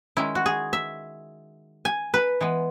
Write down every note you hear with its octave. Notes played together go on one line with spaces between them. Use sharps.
D#3 G#3 C#4 E4
F#4
G#4
E5
G#5
B4
E3 G#3 B3